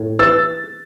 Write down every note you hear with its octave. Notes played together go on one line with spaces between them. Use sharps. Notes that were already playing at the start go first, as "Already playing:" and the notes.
Already playing: A2
E3 E6 A6